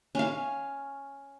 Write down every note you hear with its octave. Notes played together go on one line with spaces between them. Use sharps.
C#4 F5